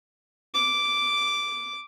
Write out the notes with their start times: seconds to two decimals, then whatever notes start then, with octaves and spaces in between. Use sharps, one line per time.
0.54 D6